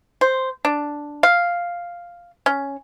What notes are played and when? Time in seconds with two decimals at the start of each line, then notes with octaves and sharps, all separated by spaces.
0.21 C5
0.65 D4
1.23 F5
2.46 C#4